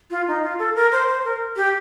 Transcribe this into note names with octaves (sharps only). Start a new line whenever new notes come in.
F4
D#4
F4
A4
A#4
C5
C5
A#4
G4